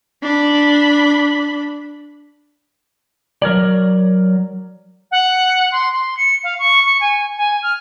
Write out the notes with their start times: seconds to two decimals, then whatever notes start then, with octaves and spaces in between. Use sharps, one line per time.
0.23 D4 B5
3.42 F#3 A#4 C#5 D5
5.11 F#5
5.72 C6
5.92 C6
6.17 C#7
6.44 F5
6.59 C#6
6.85 C#6
7.01 G#5
7.38 G#5
7.63 F6